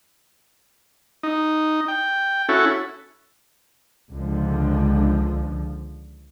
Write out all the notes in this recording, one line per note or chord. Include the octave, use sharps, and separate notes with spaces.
D#4
G5
C#4 E4 F#4 A4
C#2 D3 F3